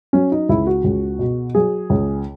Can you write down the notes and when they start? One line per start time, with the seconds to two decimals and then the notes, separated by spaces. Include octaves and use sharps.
0.13 F#3 C#4
0.32 D#4
0.49 C#2 E4
0.67 F#4
0.84 C#2
1.19 B2
1.55 F#3 G#4
1.90 C#2